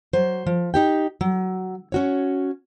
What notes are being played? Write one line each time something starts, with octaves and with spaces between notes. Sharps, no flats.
F#3 C5
F3
D#4 G4 G5
F#3
C#4 F#4 C#5